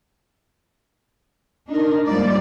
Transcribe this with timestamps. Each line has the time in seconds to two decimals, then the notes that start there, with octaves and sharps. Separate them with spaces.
1.68 D4 D#4 A#4
2.06 G#2 F3 G3 A#3 D5